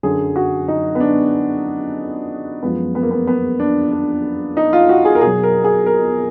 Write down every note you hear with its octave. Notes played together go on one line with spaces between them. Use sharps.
F#2 D3 F#3 G#4
F#4
D#4
B3
D4
F#2 F3 G#3 B3
B3
A#3
B3
B3
D4
D4
D#4
F4
F#4
G#4
A#4
B2 F#3 G#4
A#4
G#4
A#4